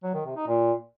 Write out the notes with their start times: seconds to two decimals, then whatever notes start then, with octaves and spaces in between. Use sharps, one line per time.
0.03 F#3
0.14 D#3
0.25 C3
0.36 D#4
0.47 A#2